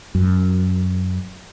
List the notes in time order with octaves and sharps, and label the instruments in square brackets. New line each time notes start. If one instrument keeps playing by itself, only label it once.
[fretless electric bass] F#2